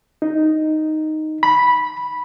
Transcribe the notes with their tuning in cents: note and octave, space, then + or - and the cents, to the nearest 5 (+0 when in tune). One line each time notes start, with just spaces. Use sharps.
D#4 +0
B5 -10